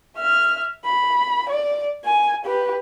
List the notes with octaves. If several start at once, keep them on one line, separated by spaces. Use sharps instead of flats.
E5 F6
B5
D5
G#5
G4 B4